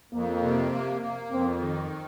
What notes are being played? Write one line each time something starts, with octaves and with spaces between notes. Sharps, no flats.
F2 A#3
C3
A#3
A#3
F2 C4
D#3